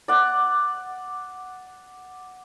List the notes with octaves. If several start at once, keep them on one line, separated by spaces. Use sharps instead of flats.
D5 F#5